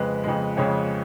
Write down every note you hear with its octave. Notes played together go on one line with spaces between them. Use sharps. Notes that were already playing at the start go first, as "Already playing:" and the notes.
Already playing: F2 C#3 G#3 B4
F2 C#3 G#3
F2 C#3 G#3 C#5